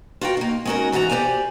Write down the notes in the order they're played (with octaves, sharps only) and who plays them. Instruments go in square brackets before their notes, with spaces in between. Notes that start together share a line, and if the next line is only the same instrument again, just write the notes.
[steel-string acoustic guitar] F4 F#4 A#4 G5
A#3 D#4
G#3 B3 C#4 D#4 F#4 A#4
G#2 E3 F#4 G#4 A#5
G4 A4 C5 D5 G#5